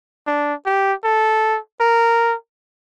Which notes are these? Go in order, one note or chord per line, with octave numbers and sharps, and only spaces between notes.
D4
G4
A4
A#4